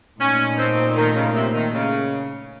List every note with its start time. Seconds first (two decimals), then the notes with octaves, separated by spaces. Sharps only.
0.20 A#2 A3 C#4 D#4
0.58 C4
0.96 D#3
1.15 C#3
1.34 C3
1.54 D#3
1.73 C#3